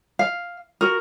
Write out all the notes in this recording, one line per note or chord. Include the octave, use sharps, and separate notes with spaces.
F5
F#4 A#4